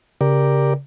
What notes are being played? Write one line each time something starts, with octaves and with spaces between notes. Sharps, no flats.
C#3 G4 A#4 D5